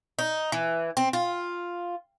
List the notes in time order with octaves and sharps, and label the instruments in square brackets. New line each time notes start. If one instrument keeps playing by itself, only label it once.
[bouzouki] D#4
E3
C4
F4